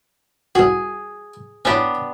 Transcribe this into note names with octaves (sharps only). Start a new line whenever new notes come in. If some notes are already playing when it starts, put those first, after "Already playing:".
C2 F#4 G#4
B3 C#4 D4 E4 G4